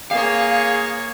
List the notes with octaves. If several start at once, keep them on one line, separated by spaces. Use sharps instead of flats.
A#3 G#4 C#5 F5